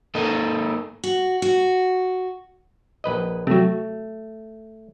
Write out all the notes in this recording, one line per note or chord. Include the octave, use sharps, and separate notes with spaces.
A#3 D#4 A4 A#4 D#5
F#4
F#4
A#1 B4 D#5
C3 F#3 A3